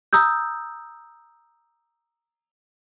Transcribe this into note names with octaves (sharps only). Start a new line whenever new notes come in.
A#5 D#6 E6 G6